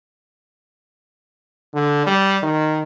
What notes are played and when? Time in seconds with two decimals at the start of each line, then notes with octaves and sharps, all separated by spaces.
1.74 D3
2.06 G3
2.43 D#3